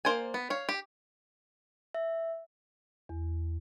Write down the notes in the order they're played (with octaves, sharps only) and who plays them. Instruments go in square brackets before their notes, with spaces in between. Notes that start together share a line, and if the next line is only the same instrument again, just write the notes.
[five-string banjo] A#3 C5 D5 G#5
B3
C#5 F5
G4
[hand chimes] E5
[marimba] E2